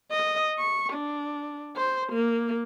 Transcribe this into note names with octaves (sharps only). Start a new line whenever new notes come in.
D#5
C#6
D4
C5
A#3